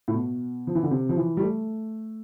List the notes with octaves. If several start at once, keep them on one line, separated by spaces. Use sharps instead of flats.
A2
B2
F3
E3
D3
C3
F3
E3
G3
A3